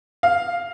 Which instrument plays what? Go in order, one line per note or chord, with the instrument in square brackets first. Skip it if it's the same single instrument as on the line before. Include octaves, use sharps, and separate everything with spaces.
[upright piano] F5